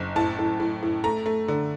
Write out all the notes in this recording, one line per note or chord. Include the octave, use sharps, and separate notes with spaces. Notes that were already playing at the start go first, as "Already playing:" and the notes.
Already playing: F#1
A2 A5
A2
A2
A2
A3 A#5
A3
D3